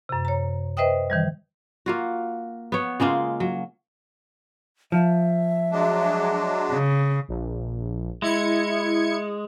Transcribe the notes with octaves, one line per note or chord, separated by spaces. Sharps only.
F#2 C3
C#5 A#5
B4 C5 D#5 E5 G5 D#6
D#3 E3 G3
A#3 F4 F#4
B3 C#5
C#3 G#3 A#3 F4
F#3
F3 E5
F#3 G#3 D4
C#3
A#1
G#3 E4 G#6 C#7